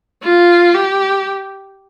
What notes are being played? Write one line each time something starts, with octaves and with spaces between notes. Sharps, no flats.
F4
G4